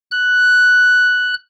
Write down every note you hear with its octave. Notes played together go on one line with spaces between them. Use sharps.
F#6